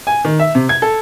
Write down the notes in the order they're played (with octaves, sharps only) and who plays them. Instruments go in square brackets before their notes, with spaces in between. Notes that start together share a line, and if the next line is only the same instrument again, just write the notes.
[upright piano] G#5
D#3
E5
C3
G#6
A4